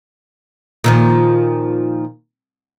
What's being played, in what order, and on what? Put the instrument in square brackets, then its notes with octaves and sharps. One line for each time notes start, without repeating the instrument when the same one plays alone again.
[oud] A#2 D#3 F3